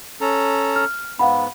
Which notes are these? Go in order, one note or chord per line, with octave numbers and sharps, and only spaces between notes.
C#4 A4 A#5
F6
G#2 B3 F5 F#5 B5